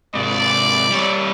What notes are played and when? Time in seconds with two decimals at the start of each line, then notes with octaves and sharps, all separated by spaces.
0.15 G#2 C3 D5
0.92 G3 C#5